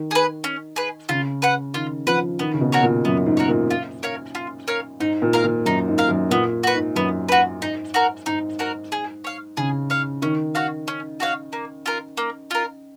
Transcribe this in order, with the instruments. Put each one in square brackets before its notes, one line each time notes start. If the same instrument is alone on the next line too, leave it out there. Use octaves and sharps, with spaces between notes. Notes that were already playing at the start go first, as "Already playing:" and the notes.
Already playing: [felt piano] D#3
[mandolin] G#4 B4
C#4
G#4 B4
[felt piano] C#3 [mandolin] F4
[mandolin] B4 F#5
[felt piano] D#3 [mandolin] F4
[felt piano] F3 [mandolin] B4 F#5
[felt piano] D#3 [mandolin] B3
[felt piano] C#3
B2
[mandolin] F#4 A#4 C#5
[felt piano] A#2
[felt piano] F#2 [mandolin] B3
[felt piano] G#2
[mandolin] F#4 A#4 C#5
[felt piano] A#2
[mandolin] F4
A#4 C#5 F5
F4
A#4 C#5 F5
[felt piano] G#2 [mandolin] D#4
[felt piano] A#2
[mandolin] A#4 F5
[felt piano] A#2
[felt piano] F#2 [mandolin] D#4
[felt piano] G#2
[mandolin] A#4 F5
[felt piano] F#2
[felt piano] A#2 [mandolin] B3
[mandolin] F#4 B4
[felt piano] G#2
[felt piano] F#2 [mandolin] B3
[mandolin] F#4 B4
[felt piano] G#2 [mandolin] D#4
[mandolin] F#4 A#4
[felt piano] G#2 [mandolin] D#4
[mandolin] F#4 A#4
G#4
C#5 F5
[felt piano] C#3 [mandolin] G#4
[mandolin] C#5 F5
[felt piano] D#3 [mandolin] C#4
[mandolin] F#4 C#5 F5
C#4
F#4 C#5 F5
A#3
F4 A#4
A#3
F4 A#4